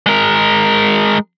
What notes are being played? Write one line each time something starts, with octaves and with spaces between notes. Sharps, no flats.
G#3 A#4